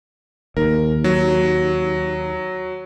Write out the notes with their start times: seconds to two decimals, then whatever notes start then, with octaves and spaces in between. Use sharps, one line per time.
0.57 D#2 A#4
1.04 F#3